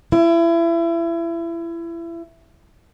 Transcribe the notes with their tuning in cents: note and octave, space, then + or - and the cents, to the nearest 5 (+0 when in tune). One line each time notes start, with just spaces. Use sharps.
E4 +30